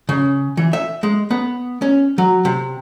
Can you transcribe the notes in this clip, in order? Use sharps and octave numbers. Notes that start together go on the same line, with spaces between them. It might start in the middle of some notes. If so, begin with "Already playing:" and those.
C#3
E3
E5
G#3
B3
C#4
F#3
C3